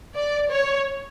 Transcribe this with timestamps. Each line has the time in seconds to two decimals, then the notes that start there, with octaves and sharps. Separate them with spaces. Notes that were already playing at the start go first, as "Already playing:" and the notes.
0.14 D5
0.51 C#5